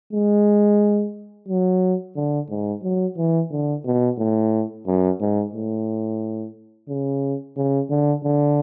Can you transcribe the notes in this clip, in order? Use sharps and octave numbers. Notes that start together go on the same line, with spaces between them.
G#3
F#3
D3
G#2
F#3
E3
D3
B2
A2
F#2
G#2
A2
C#3
C#3
D3
D3